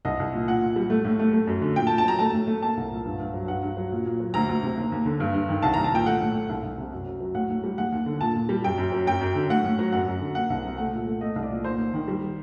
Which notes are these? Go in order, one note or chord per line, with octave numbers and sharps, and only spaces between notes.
C2 D#5
C2
A#2
A#2 F#5
A#2
G3
A3
A2
A3
A3
F#2
D3
A#2 G5
A5
A#2
A5
F#3 A#5
A3 A5
A2
A3
A#3 A5
C2
A#2
G2
G2
F#3
G2 F#5
G2
F#3
A#2
A#2
F#3
D2 A#5
D2
C3
D#2
D#2
D3
G2
G2
D#3
C2 A5
C2 A#5
A5
A#2 G5
A3 F#5
A2
A3
C2
C2
C3
F#2
F#2
F#3
A2 F#5
A2
G3
D#2 F#5
D#2
D3
A#2 A5
A#2
G3
F#2 G5
F#2
F#3
F#2 G5
F#2
D3
A2 F#5
A2
F#3
F#2 F#5
F#2
D3
A#3 F#5
C2
C3
A3 F#5
A#2
A3
A3 D#5
C2
D5
A#2
D#2 C5
D#2
D#3
G3